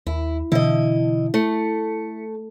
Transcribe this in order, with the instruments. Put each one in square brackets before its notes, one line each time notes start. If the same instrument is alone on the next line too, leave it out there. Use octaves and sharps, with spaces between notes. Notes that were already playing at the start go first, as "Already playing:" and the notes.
[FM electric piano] D#2 [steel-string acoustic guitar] E4
[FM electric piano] B2 D3 E3 [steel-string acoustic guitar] E4 D#5
[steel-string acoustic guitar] A3 [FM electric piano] E4 C#7